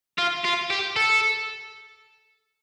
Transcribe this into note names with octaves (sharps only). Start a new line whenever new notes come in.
F4
F4
G4
A4